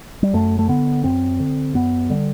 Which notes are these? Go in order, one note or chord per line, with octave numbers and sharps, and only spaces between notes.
G3
F#2 A3
A3
D3 B3
F#2 C4
D3
F#2 B3
D3 G3